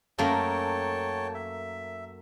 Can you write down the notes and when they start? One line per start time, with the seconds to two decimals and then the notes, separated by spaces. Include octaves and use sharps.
0.18 F#2 A3 A#3 C#5 G5 A5
1.34 E5